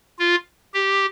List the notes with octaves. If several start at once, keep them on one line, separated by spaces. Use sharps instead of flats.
F4
G4